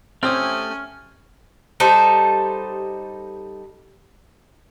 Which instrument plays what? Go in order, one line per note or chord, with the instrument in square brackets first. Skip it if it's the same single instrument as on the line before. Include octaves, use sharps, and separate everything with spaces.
[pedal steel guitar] A3 G4 D#6 [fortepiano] C4 [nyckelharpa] C#4 G#5 [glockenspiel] F6
[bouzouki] G3 D#4 A4 C5